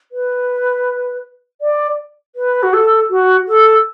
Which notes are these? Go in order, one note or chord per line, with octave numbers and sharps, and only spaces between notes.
B4
D5
B4
F#4
A4
F#4
A4